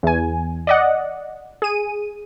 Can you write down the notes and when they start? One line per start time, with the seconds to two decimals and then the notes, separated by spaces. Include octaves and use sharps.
0.03 E2 G#5
0.67 D5 D#5 F#5
1.62 G#4 D#7